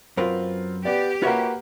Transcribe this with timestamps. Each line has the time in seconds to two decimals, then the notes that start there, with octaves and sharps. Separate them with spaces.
0.17 F#2 C4 F4 A#4 B4
0.85 B3 G4 D5
1.22 A#3 F4 F#4 B4 C#5 E5